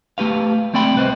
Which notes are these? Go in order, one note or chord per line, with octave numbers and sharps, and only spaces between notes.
A3 G4 B4 F5
A3 C4 D5 G5 B5
C2 B4 C5 D#5